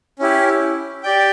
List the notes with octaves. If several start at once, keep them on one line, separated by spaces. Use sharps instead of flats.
C#4 E4 G4
G4 D5 G5